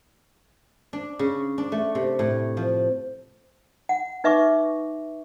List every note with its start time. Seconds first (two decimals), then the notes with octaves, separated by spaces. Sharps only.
0.93 D4
1.19 C#3
1.58 D4
1.72 A3
1.95 C3
2.19 A2
2.57 F3
3.89 F#5
4.24 D#4 B4 E5 C#6 D6